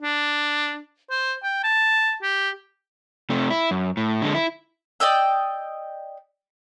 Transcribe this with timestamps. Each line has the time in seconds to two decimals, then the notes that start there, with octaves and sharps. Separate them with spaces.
0.02 D4
1.10 C5
1.43 G5
1.64 A5
2.22 G4
3.30 C3 A3
3.50 E4
3.71 F#2
3.97 A2
4.22 D3 G#3
4.35 E4
5.00 D5 D#5 G5 E6